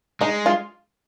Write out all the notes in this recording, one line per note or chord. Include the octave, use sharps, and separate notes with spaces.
G#3 D#4
F4